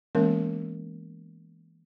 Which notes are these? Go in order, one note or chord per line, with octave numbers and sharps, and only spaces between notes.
E3 G#3 A#3 B3 C#4 A#4